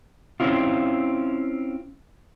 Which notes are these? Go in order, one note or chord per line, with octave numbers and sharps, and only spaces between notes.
C4 C#4 E4 F4